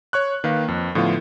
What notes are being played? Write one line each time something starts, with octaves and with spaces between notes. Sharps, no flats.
C#5 C#6 F#6
D#3 A#3 B4 F5
F2
A2 D3 F3 B3 F4